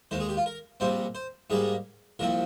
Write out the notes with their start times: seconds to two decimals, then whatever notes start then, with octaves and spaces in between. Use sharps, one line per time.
0.11 D#2 D#3 G#3 C5
0.20 G#4
0.29 G4
0.37 F4
0.46 A#4
0.80 A#1 A#2 G3 C4 C5
1.15 C5
1.50 G#2 G3 A#3 G#4
2.19 C2 A#2 F3 C4 A#4